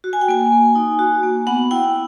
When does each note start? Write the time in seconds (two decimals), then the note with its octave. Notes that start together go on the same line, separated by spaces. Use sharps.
0.04 F#4
0.13 G#5
0.21 G5
0.28 A#3 G#5
0.52 A#3
0.75 D#4
0.99 F#4
1.23 A#3
1.47 B3 F#5
1.71 E4 G5